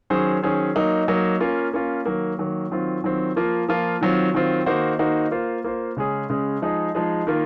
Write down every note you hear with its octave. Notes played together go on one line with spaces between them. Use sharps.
D#3 F#3 C#4 G#4 C5
D#3 F#3 C#4 G#4 C5
F#3 A#3 D#4
F#3 A#3 D#4
A#3 C#4 F4
A#3 C#4 F4
D#3 F#3 A#3
D#3 F#3 A#3
D#3 F#3 C4 F4
D#3 F#3 C4 F4
F3 A#3 F4
F3 A#3 F4
D#3 F#3 C4 F4
D#3 F#3 C4 F4
D#3 A#3 D#4 F#4 C5
D#3 A#3 D#4 F#4 C5
A#3 F4 C5
A#3 F4 C5
C#3 G#3 C#4 G#4
C#3 G#3 C#4 G#4
F3 G#3 D#4 G#4
F3 G#3 D#4 G#4
D#3 A#3 F4